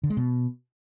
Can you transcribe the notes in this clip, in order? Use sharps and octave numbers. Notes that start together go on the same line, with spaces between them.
D3
G#3
B2